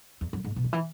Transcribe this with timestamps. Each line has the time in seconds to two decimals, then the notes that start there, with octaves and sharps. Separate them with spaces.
0.21 E2
0.33 F#2
0.44 G#2
0.56 B2
0.64 D#3
0.73 E3